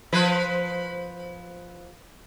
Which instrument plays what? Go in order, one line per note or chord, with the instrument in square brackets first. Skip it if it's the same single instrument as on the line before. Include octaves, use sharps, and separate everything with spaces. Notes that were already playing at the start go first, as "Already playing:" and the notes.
[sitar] F3 B4 C5